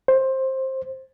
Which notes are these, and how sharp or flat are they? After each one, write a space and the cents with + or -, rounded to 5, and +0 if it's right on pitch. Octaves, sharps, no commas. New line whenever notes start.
C5 +15